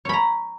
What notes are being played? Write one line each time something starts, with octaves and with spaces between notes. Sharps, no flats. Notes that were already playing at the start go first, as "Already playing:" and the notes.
C#5 A#5 B5